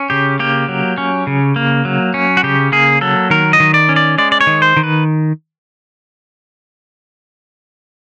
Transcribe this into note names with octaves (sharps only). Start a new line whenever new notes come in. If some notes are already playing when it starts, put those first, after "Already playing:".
Already playing: C#4
C#3 G4
A#3 G4
F#3
C#4
C#3
A#3
F#3
C#4
F#4
C#3 G4
A#3 G#4
F#3 A4
D#3 A#4
D#5
D#3
D5
C#4
D5
G#3 D5
D5
C#5
D#3
C5
D#3
B4